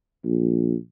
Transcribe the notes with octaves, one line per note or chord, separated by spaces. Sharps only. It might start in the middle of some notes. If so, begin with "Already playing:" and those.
A#1